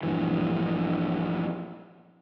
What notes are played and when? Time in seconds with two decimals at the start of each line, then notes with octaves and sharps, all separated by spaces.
0.03 A#1 G2 E3